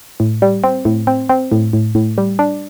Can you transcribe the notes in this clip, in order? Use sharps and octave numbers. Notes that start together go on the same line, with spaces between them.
A2
G3
C4
A2
C4
C4
A2
A2
A2
G3
D4